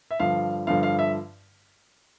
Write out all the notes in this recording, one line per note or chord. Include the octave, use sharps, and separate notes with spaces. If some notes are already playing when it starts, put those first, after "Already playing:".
E5
G2 D3 F3 F5
G2 D3 F3 F5
F5
E5